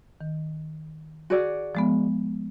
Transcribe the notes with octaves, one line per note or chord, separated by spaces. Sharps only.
D#3
F#4 G#4 D5
F3 G#3 B3